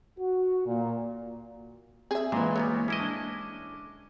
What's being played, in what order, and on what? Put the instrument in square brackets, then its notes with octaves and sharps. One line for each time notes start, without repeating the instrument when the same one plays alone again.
[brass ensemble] F#4
A#2
[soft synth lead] C4 [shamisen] G#4 E5
[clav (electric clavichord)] D2 A#2 [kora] E3 G#3 [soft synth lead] A#3
[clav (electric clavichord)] F#3 G3 B3 [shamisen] C#5
[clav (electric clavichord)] C#4 E4 D#5 [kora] G#4 [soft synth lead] D6
[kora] D4